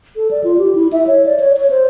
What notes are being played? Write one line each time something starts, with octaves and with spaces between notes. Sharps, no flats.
A4
D5
F4
G4
E4
E5
C#5
D5
C#5
C#5
C5